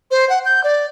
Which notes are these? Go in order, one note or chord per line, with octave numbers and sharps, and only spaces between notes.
C5
F#5
G6
D5